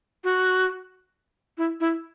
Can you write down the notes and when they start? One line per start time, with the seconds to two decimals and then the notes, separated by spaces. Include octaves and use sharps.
0.24 F#4
1.58 E4
1.80 E4